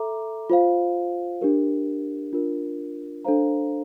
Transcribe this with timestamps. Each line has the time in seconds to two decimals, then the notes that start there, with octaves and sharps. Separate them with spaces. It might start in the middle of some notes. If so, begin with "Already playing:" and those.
Already playing: A4 E5 A#5 D6
0.50 F4 C5 F5
1.41 D4 G4 A#4
2.33 D4 F4 A#4
3.25 D4 A4 C5 F5 A#5